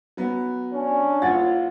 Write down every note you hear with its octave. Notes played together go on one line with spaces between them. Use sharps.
F#3 B3
C#4 D4
F#1 F4 C#5 F#5 A6